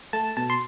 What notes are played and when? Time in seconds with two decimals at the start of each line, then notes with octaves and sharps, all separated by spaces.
0.13 A3 A5
0.37 B2 A5
0.50 C6